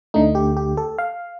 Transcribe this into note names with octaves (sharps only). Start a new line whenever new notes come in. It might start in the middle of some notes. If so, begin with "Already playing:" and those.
D2 D3 A3 D#4
G4
G4
A4
F5